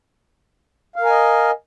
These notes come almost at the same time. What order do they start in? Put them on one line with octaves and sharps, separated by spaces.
F5 A#4 G#5 D#5